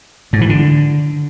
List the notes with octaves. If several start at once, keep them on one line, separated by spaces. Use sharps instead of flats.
G#2
E3
D3